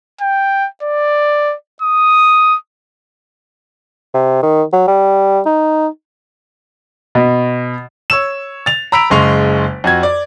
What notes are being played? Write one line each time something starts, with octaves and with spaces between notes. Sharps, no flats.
G5
D5
D#6
C3
D#3
F#3
G3
D#4
B2
C#5 E6 E7
A6 F7
A#5 B5 E6 B6 D7 F7
F#1 C#3 G#3 C6 C#6 F7
F2 F#4 G#6
D5